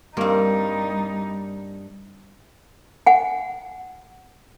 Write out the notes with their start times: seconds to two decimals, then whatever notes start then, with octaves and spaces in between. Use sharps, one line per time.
0.17 G2 G3 A#3 C4 D#4
3.06 F#5 G#5